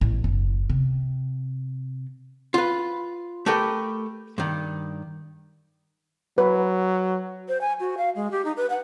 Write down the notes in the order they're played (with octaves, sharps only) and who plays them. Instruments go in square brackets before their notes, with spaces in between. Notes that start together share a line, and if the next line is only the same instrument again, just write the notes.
[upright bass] A1
F#1
C3
[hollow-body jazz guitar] F4 B4
A3 G4 A#4 B4 G5
G2 D#3
[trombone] F#3 [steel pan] B4
[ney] C5
G#5
F#4
F5
G#3
G4
D#4
B4
F#5